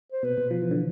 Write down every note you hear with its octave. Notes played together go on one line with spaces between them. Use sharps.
C5
B2 B4
B2
F3
E3
D3